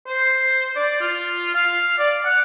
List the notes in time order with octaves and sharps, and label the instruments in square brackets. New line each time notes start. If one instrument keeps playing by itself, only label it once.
[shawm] C5
D5
F4
F5
D5
F#5